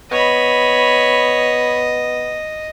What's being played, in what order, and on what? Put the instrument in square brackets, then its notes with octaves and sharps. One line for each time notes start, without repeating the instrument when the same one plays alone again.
[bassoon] B3 [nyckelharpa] C#5 B5 [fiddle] D#5